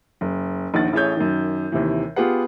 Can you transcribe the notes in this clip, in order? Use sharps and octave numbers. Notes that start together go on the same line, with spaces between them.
F#1
A#1 D#2 D#3 F#5 A6
A1 E4 G#4 C#5 G6
F#2 D#3
D#2 C3 E3
B3 F4 G4 G#4 B4 F#5